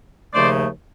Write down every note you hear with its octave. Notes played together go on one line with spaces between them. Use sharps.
D#2 C#3 F3 A3 C5 D5